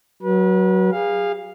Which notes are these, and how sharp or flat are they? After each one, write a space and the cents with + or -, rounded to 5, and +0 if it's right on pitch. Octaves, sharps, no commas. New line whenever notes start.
F#3 +10 B4 -35
G#4 -30 F5 +0